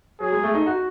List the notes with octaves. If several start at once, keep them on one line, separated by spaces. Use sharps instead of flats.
F#3 G#4
G#3
A3
D#4
F#4